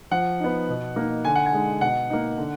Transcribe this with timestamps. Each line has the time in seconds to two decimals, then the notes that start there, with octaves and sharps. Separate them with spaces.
0.11 F3 F#5
0.40 B3 D#4
0.68 B2
0.96 A#3 D#4
1.25 D3 G#5
1.35 F#5
1.46 G#5
1.53 G#3 D#4
1.81 B2 F#5
2.10 A#3 D#4
2.38 D3